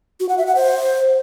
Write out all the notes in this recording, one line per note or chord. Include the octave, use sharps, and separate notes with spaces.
F#4
F#5
E5
F#5
C5